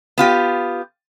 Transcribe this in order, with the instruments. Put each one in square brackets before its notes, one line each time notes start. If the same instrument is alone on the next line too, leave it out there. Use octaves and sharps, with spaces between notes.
[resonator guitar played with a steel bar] B3 F4 G4